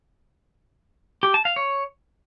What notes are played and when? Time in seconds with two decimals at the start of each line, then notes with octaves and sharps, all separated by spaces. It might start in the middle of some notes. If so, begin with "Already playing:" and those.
1.23 G4
1.34 A5
1.45 F5
1.56 C#5